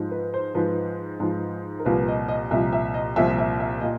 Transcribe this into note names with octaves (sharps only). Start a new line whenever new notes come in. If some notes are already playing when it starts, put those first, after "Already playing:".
Already playing: G#2 F3
B4
C5
G#2 F3 B4
G#2 F3
A#4
C2 A#2 F3 B4
D#5
D#5
C2 A#2 F3 E5
E5
D#5
C2 A#2 F3 E5
E5
E5
A#2 D#5